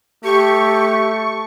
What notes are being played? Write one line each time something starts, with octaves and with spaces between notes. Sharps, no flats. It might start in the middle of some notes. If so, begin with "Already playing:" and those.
A3 G4 C#6